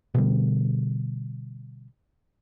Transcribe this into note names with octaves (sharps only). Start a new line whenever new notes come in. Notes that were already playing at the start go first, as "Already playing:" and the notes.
B2 D3 G3